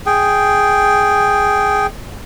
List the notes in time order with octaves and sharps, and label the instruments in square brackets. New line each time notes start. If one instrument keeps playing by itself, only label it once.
[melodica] G#4 G5